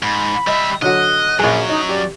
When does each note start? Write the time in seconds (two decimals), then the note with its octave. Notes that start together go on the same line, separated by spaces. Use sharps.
0.03 G#2 B5
0.47 G3 D#5 E5
0.82 D3 F#3 F#4 D#5 F#6
1.39 A#1 F#3 C#4 G#4
1.69 D#4 D#5
1.89 G4 D5